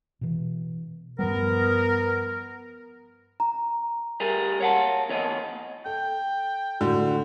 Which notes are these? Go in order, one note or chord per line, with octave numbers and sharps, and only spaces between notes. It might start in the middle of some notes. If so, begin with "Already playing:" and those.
B2 E3
G2 F3 G3 B3 A#4
A#5
G3 G#4 A#4
C#5 F#5 A5
E2 C#5 D#5
A4 G5
A2 D3 F#4